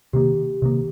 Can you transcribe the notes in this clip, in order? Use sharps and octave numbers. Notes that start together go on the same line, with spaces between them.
C3 D#3 A#3 G4
C3 D#3 A#3